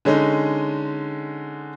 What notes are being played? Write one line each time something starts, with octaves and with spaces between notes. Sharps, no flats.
D3 G#3 C#4 D#4